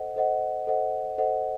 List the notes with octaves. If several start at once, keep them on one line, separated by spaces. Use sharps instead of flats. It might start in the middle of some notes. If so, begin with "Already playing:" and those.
Already playing: A4 C5 D#5 F#5
A4 C5 D#5 F#5
A4 C5 D#5 F#5
A4 C5 D#5 F#5